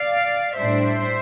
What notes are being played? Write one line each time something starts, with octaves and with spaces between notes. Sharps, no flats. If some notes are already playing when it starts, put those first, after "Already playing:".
Already playing: D5 F5
A2 G3 D4 C5 E5